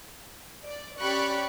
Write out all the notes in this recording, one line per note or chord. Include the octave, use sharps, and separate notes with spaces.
D5
C#4 G4 D5 B5 C#6 F#6